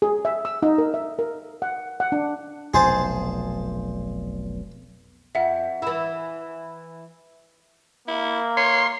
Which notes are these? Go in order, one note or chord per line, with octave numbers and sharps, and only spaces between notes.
G#4
E5
E6
D#4
A#4
E5
A#4
F#5
F#5
D4
F1 B1 G#4 C5 A5
F2 E5 F#5
E3 E4
A#3 E4
C#5 C6